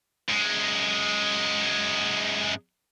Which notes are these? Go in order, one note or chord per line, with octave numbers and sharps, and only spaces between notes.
F#2 G#3